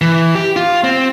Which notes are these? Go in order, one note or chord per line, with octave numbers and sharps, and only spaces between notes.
E3
G4
F4
C4